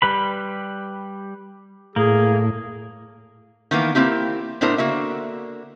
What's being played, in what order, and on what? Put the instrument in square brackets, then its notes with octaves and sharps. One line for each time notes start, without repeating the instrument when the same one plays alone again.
[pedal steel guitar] G3 B4 B5
[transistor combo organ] A2 [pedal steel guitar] A#3 [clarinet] G#4
[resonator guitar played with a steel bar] D#3 E3 A#3 B3
A#3 C4 E4 G4
A2 B3 D4 E4 A#4 C5
D3 A#3 F#4 E5